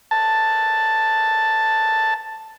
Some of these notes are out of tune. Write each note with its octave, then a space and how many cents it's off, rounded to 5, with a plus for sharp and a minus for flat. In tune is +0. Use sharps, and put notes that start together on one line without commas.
A5 +5